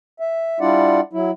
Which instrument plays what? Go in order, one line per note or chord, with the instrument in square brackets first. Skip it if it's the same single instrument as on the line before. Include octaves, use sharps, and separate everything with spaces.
[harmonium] E5
G3 D4 E4 F4 D5 F#5
F#3 E4